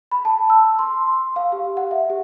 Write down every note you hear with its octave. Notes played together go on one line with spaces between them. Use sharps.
B5
A5
E6
C6
F5
G4
F#5
E5
G4